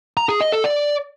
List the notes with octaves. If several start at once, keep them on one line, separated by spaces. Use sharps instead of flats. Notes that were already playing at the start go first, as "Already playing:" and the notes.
A#5
G#4
D#5
A4
D5